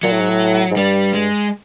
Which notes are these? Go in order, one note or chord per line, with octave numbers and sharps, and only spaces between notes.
A#2 F#3
A2
G#2
A2
G#2
G2 G3
G#3